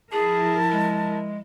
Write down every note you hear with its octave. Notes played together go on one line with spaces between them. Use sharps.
F3 E4 G#4 A#4 A5
G#3